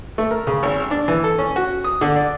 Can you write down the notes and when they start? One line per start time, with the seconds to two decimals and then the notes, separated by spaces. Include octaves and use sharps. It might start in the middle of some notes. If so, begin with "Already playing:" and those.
0.18 A3
0.31 A#4
0.47 C#3
0.63 G#1
0.91 D4
1.08 E3
1.24 A4
1.38 C#4
1.56 F#4
1.84 D#6
2.01 D3
2.16 D5